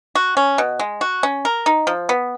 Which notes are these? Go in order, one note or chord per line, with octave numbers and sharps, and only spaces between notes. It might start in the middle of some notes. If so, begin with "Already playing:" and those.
F#4
C#4
B2
G#3
F#4
C#4
A#4
D#4
F3
B3